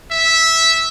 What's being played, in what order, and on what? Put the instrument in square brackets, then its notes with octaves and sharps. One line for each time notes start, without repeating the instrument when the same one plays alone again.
[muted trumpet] E5